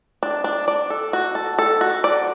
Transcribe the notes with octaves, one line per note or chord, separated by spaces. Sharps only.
D4
D4
D5
A4
F#4
A4
A4
F#4
D5